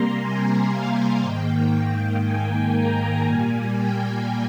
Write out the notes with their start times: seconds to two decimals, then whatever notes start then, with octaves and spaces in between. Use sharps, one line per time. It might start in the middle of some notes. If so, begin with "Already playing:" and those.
Already playing: C3 G3 A#3 A#5 C6
0.20 G#5
0.72 F5
1.22 G#2 D#3 A#3 G5
2.23 G#5
2.75 A#5
3.25 A#2 G3 A#3 G#5
3.75 G5